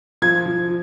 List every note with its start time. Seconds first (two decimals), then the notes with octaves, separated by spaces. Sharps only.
0.22 F3 G#6
0.46 F3